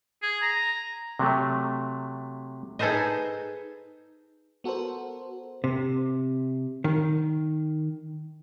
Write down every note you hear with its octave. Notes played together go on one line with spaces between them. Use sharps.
G#4
A#5
C3 F#3 A3
D#4 G#4 A4 B4 C5 D#5
B3 F#4 A4 A#4 C5
C3
D#3